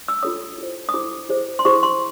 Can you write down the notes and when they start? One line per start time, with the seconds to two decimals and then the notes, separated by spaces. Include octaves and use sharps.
0.08 E6
0.23 F4 A4 C#5 D#6
0.58 E4 A4 C5
0.89 D#6
0.94 E4 A4 C5 D6
1.29 E4 G#4 C5
1.59 C6
1.65 E4 G#4 C5 C#6
1.83 C6